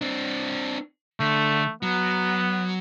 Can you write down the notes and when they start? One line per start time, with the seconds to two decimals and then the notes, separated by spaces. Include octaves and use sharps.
0.01 C4 D4
1.20 D3 A3
1.83 F#3 B3